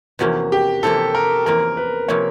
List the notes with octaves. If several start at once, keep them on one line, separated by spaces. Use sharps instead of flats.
E2 C3 F3 A#3 C#4 F#4
G4
E2 C3 F3 A#3 C#4 A4
A#4
E2 C3 F3 A#3 C#4 A#4
B4
C3 F3 A#3 C#4 C#5